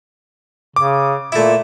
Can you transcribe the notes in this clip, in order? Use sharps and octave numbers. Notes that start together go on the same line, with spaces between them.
C#3 D6
A#2 A3 E4